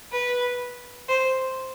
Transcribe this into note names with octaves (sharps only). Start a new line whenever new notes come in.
B4
C5